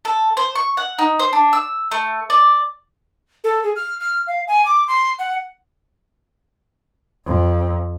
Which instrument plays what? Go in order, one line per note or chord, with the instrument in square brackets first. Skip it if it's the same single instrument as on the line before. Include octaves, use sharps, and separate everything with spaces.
[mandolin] A4
C5
C#6
F#5
D#4
C5
D4
E6
A3
D5
[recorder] A4
G#4
F6
F6
F5
G#5
D6
C6
F#5
[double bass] F2